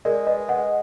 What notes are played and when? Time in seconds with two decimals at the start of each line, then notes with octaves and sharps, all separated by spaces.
0.05 G#3 A#4 D5
0.27 B4 D#5
0.48 D#5 F#5